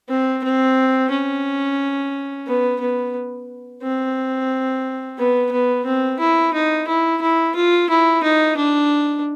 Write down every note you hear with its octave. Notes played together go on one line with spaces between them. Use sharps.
C4
C4
C#4
B3
B3
C4
B3
B3
C4
E4
D#4
E4
E4
F4
E4
D#4
D4